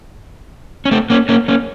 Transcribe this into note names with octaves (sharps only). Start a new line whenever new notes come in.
C#4
A3 C4
A#3 C#4
A#3 C#4
A#3 C#4